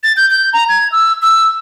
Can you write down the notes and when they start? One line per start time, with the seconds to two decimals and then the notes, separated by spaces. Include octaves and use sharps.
0.04 A6
0.17 G6
0.31 G6
0.53 A#5
0.69 G#6
0.92 E6
1.22 E6